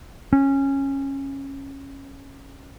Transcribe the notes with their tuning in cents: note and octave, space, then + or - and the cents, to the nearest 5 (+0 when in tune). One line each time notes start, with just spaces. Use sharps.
C#4 -15